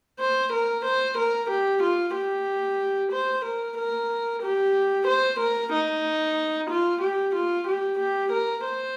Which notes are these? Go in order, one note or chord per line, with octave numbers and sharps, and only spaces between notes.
C5
A#4
C5
A#4
G4
F4
G4
C5
A#4
A#4
G4
C5
A#4
D#4
F4
G4
F4
G4
G4
A#4
C5